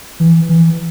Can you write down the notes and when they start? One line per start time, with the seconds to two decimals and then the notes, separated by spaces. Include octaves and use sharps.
0.20 E3
0.49 E3